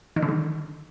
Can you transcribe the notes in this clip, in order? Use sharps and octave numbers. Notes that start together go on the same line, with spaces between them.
D#3
D3
D#3